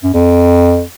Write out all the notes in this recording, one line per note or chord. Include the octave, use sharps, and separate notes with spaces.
F#2
F2